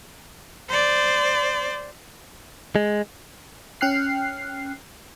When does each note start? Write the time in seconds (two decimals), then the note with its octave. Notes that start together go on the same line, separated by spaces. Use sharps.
0.69 C5 D5
2.76 G#3
3.81 C#4 G5 F6 F#6 C7